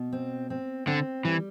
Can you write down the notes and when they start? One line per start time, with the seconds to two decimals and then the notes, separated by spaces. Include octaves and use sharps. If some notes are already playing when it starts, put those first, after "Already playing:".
Already playing: B2
0.13 C4
0.50 C4
0.87 D3 C4
1.25 E3 G3